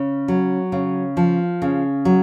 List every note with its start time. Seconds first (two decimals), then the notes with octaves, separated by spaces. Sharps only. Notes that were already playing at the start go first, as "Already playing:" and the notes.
Already playing: C#3
0.28 F#3
0.72 C#3
1.17 F3
1.62 C#3
2.05 F#3